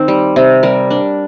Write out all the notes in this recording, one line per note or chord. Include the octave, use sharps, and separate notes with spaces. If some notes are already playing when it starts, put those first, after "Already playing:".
Already playing: D#3 C4 D#4
G3
C3
G3 A#4
D4